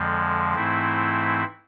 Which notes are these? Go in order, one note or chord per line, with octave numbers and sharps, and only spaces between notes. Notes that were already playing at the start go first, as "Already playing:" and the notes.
Already playing: F2 D3 F3 G#3
G#2 E3 A3 C4 E4